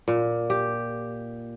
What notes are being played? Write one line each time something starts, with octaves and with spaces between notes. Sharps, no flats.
A#2
G4